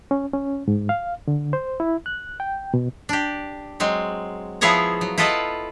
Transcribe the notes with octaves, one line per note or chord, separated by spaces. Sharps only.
C#4
C#4
G#2
F5
D3
C5
E4
F#6
G5
B2
D4 G4
F#3 G#3 C4
F3 B3 E4 G#4 C#5 A#5
F#3
E4 F4 A4 B4 D#5 E5